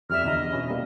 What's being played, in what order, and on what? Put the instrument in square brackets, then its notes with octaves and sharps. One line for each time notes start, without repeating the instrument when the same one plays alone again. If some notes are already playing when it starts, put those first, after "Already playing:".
[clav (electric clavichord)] F2 G3 D5 [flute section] E5 F6
[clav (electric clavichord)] E2 D3 A#5 [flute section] D#5
[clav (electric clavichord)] B2 C#4 E4
G3 A#3